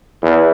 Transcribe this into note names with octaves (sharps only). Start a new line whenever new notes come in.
E2